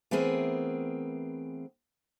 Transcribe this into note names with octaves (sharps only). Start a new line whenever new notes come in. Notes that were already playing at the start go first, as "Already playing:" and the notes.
E3 A3 B3 C4 G#4 A#4